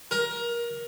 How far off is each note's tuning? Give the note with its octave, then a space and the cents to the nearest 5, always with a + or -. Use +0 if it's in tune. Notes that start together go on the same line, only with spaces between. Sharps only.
A#4 +20